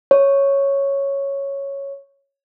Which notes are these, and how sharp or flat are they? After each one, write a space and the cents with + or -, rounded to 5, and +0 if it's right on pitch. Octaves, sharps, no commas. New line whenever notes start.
C#5 -5